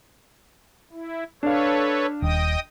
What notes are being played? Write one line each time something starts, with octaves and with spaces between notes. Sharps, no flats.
E4
D4 A4 B4 C#5 F5
D#1 D#5 G5 D#6